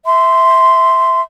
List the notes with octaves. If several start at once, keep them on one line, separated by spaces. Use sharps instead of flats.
E5 C6